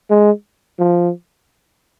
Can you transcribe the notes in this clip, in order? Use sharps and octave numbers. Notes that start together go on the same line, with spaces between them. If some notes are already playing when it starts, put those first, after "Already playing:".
G#3
F3